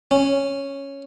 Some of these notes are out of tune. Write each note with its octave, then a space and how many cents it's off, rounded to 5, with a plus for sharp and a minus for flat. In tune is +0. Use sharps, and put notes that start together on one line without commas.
C#4 -5